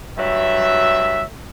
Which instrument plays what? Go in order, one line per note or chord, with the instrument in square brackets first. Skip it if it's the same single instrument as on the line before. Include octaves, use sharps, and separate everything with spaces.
[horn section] G2 F#3 E5